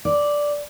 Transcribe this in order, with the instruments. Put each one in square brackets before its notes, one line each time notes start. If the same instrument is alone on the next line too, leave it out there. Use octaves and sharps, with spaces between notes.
[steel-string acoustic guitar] D5